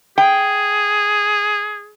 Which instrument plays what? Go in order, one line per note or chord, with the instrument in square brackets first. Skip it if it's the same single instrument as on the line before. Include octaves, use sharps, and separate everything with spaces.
[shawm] G#4 [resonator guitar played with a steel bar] G5